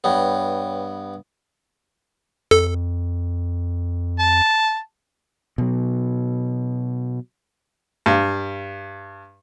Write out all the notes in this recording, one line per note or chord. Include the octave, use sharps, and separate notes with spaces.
G2 B3 B4 C#5 G5
F2 A4
A5
B2 F#3
G2